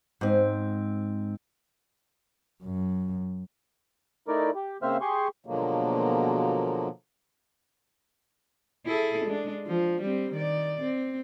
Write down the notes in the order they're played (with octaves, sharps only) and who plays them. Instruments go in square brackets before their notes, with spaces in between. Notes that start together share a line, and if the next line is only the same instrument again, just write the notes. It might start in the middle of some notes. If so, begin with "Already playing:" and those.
[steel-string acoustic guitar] G#2 C4
[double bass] F#2
[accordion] A3 D#4 E4 A#4 D5
G4
C#3 A#3 C4 C5 E5 F6
G4 G#4 C6 C#6
[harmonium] B2 D3 F3 F#3 G#3 A#3
[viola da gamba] E4 G#4 A4
G#3 D4
F3
G3 C4
D#3 D5
C4